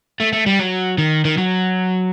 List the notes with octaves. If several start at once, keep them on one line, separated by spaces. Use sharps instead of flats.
A3
A3
G3
F#3
D#3
D#3
F#3